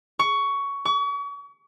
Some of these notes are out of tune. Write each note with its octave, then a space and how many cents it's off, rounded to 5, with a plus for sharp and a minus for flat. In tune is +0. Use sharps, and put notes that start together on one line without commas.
C#6 +15
C#6 +40